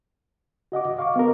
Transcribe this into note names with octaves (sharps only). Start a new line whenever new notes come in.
F#4 D#5 F#5 D6
D#5
F5 C#6 D6
B3 A#4